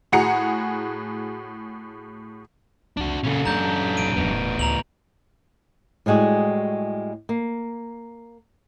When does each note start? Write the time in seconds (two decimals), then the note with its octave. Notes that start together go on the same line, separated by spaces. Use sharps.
0.12 A2 F#4 G#4 F#5 A#5 C#7
2.97 C2 F2 D4 F#4
3.24 F2 A#2 C#3 C#4 A4
3.45 F#2 A#3 D4 D#4 A#5 G6
3.97 C2 G#2 D7 D#7
4.16 D#1 D2 A2 B3
4.59 C#2 A#5 F7 F#7
6.06 A2 G3 G#3 F#4 G#4
7.29 A#3